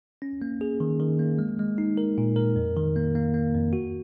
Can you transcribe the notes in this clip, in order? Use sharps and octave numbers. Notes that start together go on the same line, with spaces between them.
C#4
A#3
G#4
D#3
D#3
A#3
G#3
G#3
D#4
A#4
A#2
A#4
F2
D#3
A#3
A#3
A#3
F2
F#4